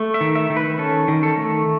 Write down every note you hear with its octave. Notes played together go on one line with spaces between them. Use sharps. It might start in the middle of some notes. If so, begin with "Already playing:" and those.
Already playing: A3
E5
D#3
E5
D#3
B4
C#4 A4
D#3
A4
A3